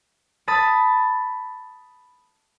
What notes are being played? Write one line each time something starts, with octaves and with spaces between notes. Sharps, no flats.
A5 B5 D#6 A6